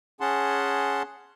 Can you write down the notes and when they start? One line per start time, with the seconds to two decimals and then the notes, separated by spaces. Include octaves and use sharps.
0.21 C#4 G#4 F#5 A5 C6